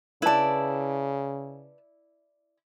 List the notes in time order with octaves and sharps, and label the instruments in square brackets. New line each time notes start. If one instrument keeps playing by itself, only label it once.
[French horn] C#3 [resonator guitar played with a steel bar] E4 D5 [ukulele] B4 A5